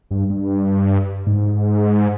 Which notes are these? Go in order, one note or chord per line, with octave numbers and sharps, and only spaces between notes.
G2
G2
G#2